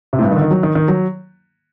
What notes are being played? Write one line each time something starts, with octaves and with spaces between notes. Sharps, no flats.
C3
A2
G2
D#3
D3
D#3
F#3
D#3
D#3
F#3